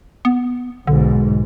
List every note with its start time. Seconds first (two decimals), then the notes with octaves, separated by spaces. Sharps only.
0.25 B3
0.87 B1 G#2 D3